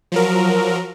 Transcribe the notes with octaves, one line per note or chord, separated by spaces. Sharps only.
F3 F#3 A#4